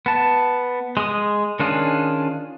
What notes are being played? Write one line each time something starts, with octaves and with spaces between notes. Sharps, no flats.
B3 A5
G#3 D#6
D#3 C#4 D4 F4 G#4